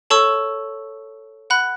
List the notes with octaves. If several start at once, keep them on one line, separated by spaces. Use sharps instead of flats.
A4 C#5 A5 C#6 E6
F#5 B5 F#6